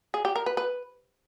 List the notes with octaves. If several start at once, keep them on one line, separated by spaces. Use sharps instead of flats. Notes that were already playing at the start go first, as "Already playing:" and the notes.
G#4
G4
A#4
B4
B4